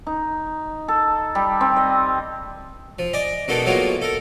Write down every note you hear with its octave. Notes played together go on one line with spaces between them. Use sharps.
D#4
A4
G3
C4
D#5
F3
D5 D#5 G#5
B2 G#3 A#3 B3 D#4 A4
A2 F#3 G#3 A#3 B3 F4
A4 A#4